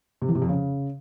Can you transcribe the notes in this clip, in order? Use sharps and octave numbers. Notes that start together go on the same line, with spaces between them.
C3
E3
C3
F2
C#3